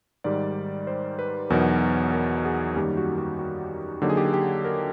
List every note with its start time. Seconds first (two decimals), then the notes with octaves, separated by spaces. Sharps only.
0.24 G#2 D#3 G3 D5
0.87 C5
1.19 B4
1.50 E2 B2 F#3 B3 D#4 A#4
2.13 A#4
2.45 G#4
2.76 F#2 D#3 G3 A#3 G4
2.97 F#4
3.18 F#4
3.39 F#4
4.02 D3 F#3 A#3 D#4 G4
4.10 G#4
4.17 G4
4.26 G#4
4.34 G4
4.64 A#4